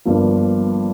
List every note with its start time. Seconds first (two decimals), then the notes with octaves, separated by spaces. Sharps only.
0.05 G1 G2 F3 A#3